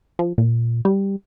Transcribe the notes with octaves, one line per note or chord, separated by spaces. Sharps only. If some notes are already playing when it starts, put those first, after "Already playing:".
F3
A#2
G3